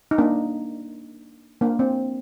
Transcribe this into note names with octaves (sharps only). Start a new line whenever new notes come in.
D#4
A#3 D4
A#3 D4
C4